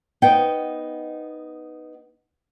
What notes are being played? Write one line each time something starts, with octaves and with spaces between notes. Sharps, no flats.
B3 D#4 C5 F#5 G5